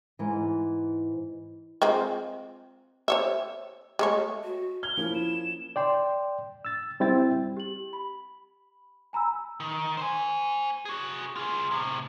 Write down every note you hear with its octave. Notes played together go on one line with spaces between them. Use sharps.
G#2 E3
G#3 C4 F4
C5 C#5 E5
G#3 A3 C#5
F#4
F6 G#6 G7
F3 A#3 C#4 E4
E7
D5 G5 C6
E6 A6
G3 C4 E4 G5 A6
G4 F#7
B5
G#5 A#5 B5 E6
D#3
C5 G#5
F#4 G#4
F4 G#4
A2 C3